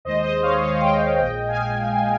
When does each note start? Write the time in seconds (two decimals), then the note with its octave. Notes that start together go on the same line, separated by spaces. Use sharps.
0.05 D#2 D#3 G#3 C5 D#5
0.24 C5 D#5
0.43 C#5 F5
0.62 C#5 F5
0.77 F5
0.81 D#5 G5
1.00 C#5 F5
1.19 A#1 A#2 G#3 D#5 G5
1.48 F5 G#5